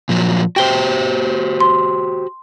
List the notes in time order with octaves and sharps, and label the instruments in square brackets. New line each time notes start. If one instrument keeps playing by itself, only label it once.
[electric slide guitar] A#2 F3 F#3
[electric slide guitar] F#4 G4 C5 [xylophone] G5 G7
[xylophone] C6